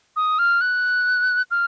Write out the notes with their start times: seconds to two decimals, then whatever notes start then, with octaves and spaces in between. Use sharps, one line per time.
0.16 D#6
0.39 F6
0.61 F#6
1.51 F6